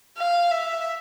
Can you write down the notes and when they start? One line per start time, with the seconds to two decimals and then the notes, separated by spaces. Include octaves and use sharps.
0.18 F5
0.51 E5